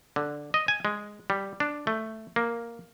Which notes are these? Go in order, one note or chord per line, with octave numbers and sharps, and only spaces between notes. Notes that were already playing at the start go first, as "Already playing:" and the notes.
D3
D#5
G#5
G#3
G3
D4
A3
A#3